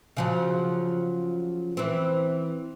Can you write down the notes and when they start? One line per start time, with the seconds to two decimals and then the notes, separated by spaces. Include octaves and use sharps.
0.17 C#3 F3 F#3
1.77 E3 C4